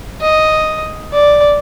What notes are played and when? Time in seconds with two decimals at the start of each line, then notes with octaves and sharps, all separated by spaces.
0.21 D#5
1.13 D5